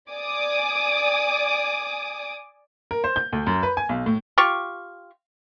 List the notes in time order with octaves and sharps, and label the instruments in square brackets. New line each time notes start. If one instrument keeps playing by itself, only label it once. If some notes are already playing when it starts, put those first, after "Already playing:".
[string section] D5 G#5 D6 D#6
[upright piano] A#4
C5
G6
D2
F#2
B4
G#5
B1
A2
[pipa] F4 G4 C#6